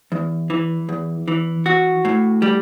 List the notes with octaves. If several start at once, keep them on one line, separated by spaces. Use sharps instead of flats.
E2
E3
E2
E3
F#4
A2
G3